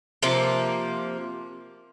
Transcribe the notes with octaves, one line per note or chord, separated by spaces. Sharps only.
C3 F3 A#3